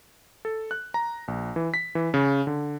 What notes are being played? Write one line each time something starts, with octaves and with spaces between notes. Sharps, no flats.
A4
F#6
A#5
A#1
E3
B6
E3
C#3
D3